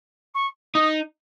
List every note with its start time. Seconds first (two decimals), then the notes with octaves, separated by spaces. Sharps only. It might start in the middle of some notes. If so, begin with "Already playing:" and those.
0.34 C#6
0.74 D#4 D#6